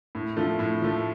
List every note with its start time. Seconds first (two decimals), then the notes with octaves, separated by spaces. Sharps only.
0.15 A2
0.37 F3 A3
0.59 A2
0.82 F3 A3